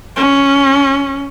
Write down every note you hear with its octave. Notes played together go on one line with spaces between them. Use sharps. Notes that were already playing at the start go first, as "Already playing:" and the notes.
C#4